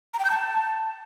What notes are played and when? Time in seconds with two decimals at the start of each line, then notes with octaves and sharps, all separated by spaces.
0.14 A#5
0.19 G5
0.25 G6
0.30 A5